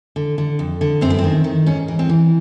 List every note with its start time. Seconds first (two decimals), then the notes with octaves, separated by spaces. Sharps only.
0.16 D3
0.38 D3
0.59 F2
0.81 D3
1.01 F#2 C4
1.10 B3
1.18 C4
1.24 D#3
1.44 D#3
1.66 G#2 C#4
1.88 E3
1.99 C4
2.09 E3